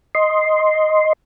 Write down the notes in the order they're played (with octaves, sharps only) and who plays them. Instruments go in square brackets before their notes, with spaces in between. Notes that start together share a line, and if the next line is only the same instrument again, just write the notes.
[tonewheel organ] D#5 C6